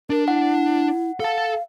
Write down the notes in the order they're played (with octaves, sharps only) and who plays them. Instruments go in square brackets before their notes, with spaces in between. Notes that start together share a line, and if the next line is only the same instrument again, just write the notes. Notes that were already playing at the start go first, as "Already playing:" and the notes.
[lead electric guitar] D4 [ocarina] A#4
[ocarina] E4 [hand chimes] F#5
[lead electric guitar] A4 A5 [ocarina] F5